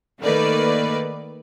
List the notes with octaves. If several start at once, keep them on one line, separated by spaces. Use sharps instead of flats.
D#3 A3 A#3 B4 D5